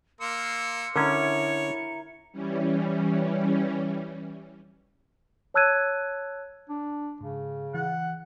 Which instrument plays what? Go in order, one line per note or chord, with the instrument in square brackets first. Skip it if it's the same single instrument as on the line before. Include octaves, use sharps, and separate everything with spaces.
[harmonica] A#3 C6 E6 [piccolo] C#7
[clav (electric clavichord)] D3 C#4 [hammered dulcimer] E4 A#4 [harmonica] C#5
[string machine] E3 G3 C#4
[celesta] C#5 A5 E6 F#6 G#6 D#7
[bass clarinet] D4
[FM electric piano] G#2 [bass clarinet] C#3
[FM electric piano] E3 [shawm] F#5